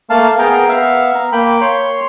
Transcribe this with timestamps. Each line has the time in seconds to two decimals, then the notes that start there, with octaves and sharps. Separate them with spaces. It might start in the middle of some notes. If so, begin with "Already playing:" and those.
0.10 A3 A#3 F5 A5
0.39 B3 G#4 A#4 G5 A#5
0.69 B3 E5 F5
1.15 A#5
1.32 A#3 G5 B5
1.61 C#5 C6